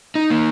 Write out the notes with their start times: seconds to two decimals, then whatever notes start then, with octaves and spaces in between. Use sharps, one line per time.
0.15 D#4
0.30 A#3